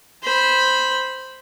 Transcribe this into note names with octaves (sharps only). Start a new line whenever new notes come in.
C5 B5